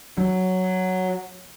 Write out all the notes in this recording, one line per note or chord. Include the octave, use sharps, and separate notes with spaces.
F#3